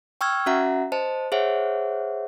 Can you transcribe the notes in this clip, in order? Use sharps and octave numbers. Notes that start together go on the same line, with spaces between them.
G5 C#6 E6 F6 G#6
C#4 F#4 E5 F#5 A#5
C5 D#5 A5
G#4 C5 C#5 E5 F#5